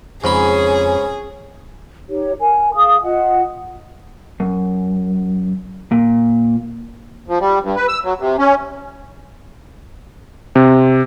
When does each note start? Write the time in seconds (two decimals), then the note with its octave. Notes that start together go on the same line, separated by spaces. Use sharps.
0.24 F2 G#2 C#3 C#4 G#4 B5
2.09 D#4 G4 C#5
2.39 A#4 G#5
2.74 G#4 F5 D#6
3.03 F4 D#5 F#5
4.40 F#2
5.92 A#2
7.28 F3
7.40 G3
7.63 G2
7.76 B4
7.88 E6
8.04 F#3
8.20 C3
8.39 C#4
10.55 C3